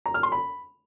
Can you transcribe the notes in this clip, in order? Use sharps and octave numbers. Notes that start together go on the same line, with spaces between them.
A#5
F6
C6
B5